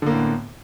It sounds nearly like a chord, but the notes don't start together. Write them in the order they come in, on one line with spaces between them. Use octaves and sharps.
D3 A#3 A2 B3